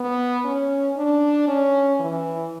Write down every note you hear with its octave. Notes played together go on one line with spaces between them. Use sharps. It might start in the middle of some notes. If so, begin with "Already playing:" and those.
Already playing: B3
C#4
D4
C#4
E3